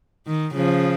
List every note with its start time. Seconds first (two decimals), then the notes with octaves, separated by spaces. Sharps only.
0.27 D#3
0.55 C#3 F3